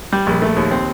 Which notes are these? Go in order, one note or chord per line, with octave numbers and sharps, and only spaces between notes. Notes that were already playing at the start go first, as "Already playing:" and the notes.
G3
A#1
A3
D#2
C4